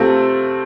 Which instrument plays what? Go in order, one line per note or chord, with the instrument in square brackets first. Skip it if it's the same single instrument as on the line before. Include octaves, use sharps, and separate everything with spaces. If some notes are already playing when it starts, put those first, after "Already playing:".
Already playing: [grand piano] C3 A3 C4 F4 A4